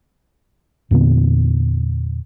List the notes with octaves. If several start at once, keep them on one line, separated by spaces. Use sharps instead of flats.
E2 A#2 D3 B3